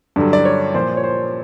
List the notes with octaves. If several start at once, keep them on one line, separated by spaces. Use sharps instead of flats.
G2 D3 F#3
D5
C#5
A#2 F3 C5 D5
C#5
C5